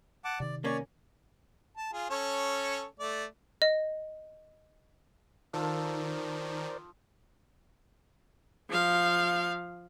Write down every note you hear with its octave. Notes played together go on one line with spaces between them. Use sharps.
F#5 A5 D6
C3 D#3 D5
A#3 C#4 C#5 D5
A5
F4 G#4
C#4 A4 C#5
A3 D5
D#5
D#3 F3 A4 A#4 C5 D5 A5
F3 F5